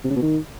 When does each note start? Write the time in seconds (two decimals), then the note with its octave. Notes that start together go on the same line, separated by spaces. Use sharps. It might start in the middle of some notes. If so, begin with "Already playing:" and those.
0.04 C3
0.10 C#3
0.16 B2
0.22 D#3